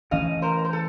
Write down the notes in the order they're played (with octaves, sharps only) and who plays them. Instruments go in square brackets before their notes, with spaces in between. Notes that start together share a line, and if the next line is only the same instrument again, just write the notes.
[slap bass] E3 A3 C#4 [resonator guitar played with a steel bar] D#5 F5
[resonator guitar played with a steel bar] A#4 C5
C5
A4